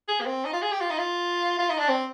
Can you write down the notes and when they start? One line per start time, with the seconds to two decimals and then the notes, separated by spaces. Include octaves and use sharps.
0.08 G#4
0.20 A#3
0.26 C4
0.45 D#4
0.53 F4
0.62 G#4
0.72 G4
0.80 F4
0.90 D#4
0.98 F4
1.59 F4
1.70 D#4
1.78 D4
1.88 C4